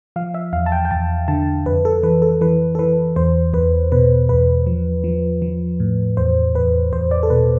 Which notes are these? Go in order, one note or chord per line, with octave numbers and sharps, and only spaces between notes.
F3 F5
E5
E2 F5
A5
G5
G5
E2 A5
D3 A5
F2 B4
A4
E3 B4
A4
E3 B4
A4
E3 B4
E2 C5
E2 B4
B2 B4
E2 B4
F3
F3
F3
A2
E2 C5
E2 B4
E2 C5
D5
A4
B2 B4